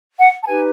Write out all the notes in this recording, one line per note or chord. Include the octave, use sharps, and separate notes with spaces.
F#5
A5
D#4 G4 B4 G#5